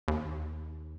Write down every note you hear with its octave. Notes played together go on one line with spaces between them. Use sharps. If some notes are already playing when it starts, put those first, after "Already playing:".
D#2